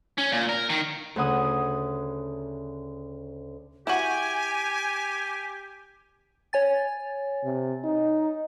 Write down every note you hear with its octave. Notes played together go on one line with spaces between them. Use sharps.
C#4
A#2
A#4
D#3
D2 C#3 F#5 D#6
E4 F#4 G4 G#5
C#5 G#5 A6
C3
D#4